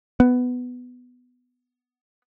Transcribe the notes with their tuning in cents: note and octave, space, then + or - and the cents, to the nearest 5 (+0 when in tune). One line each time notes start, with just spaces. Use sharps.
B3 +10